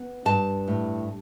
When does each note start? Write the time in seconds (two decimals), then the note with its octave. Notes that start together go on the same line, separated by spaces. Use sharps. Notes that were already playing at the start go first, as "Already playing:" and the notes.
Already playing: B3
0.25 G2 A5
0.68 A2